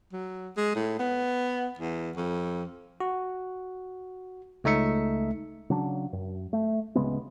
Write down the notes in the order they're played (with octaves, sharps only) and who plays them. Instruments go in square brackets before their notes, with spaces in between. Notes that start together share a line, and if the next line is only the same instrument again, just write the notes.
[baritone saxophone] F#3
G#3
A2
B3
E2
F2
[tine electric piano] F#4
C#2 A3 D#4 E5 C#7
[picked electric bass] C#3 F#3 D4
F#2
A3
D1 C#3 G#3 B3